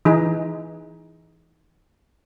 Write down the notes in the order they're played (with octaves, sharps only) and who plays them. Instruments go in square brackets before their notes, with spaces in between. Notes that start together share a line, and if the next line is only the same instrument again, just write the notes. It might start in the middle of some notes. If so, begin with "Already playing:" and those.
[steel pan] E3 D#4 G#4